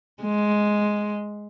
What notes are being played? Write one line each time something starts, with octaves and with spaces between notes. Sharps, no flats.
G#3